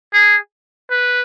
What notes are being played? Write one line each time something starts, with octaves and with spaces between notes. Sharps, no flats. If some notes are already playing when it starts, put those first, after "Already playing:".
G#4
B4